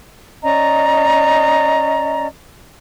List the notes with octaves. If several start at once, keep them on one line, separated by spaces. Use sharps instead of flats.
C#4 D5 D#5 A#5